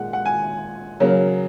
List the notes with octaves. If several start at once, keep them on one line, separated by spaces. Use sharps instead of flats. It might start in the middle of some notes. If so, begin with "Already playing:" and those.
Already playing: A#2 G#3 F#5
F#5
G#5
C#3 F#3 A#3